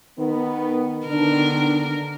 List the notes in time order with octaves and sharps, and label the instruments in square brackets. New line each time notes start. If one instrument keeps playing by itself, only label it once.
[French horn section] D#3 B3
[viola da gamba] D3 A#4 [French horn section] D#3 B3 D4